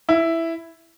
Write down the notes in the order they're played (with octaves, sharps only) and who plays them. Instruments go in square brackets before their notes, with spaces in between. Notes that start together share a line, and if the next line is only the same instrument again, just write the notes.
[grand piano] E4